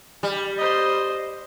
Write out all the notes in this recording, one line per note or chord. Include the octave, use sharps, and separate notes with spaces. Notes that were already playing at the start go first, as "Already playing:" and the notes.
G3
C5 D#5